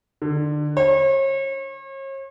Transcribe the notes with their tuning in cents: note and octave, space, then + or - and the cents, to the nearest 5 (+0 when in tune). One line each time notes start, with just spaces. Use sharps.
D3 +25
C#5 -40